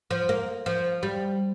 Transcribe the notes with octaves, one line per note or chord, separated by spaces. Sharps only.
F3
A#3
F3
G3